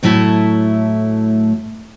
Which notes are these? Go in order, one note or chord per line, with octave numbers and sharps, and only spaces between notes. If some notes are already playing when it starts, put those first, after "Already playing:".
A2 F#3 A3 E4 A5